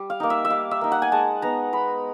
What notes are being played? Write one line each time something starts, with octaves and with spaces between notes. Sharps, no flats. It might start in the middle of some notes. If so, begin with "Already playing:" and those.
Already playing: G3
F5
A#3 D#4
E5
E5
G3 F5
E5
A#3 D#4
F#5
G#5
G#3 A5
B3 D#4 A#5
G#3 B5